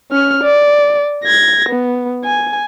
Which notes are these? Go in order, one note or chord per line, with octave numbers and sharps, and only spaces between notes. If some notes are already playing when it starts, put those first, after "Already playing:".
C#4 F6
D5
G#6 A#6
B3
G#5